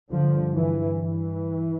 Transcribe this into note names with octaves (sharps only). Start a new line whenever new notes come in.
G2 D3 F3
E3
E3